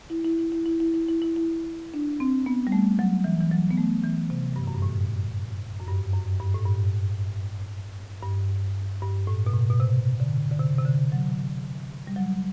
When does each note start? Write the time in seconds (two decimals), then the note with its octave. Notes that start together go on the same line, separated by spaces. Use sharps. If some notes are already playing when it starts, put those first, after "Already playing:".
0.10 E4
0.25 E4
0.39 E4
0.52 E4
0.66 E4
0.80 E4
0.94 E4
1.09 E4
1.22 E4
1.36 E4
1.94 D4
2.20 C4
2.46 B3
2.67 G3
2.72 A3
2.99 F#3
3.24 E3
3.40 E3
3.51 F#3
3.71 B3
3.78 A3
4.04 E3
4.30 C3
4.56 G2
4.67 F#2
4.74 G2
4.82 A2
5.80 F#2
5.88 G2
6.13 F#2
6.40 G2
6.54 A2
6.66 G2
8.22 G2
9.02 G2
9.27 A2
9.46 B2
9.54 A2
9.70 B2
9.80 C3
10.20 D3
10.51 D3
10.59 C3
10.79 C3
10.85 D3
11.12 F#3
12.07 G3
12.16 F#3